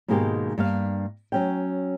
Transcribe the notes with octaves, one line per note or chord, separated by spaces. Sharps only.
G#2 B2 D#3 G#3 A#3 G4
G2 A#3 F5
F#3 C#4 G5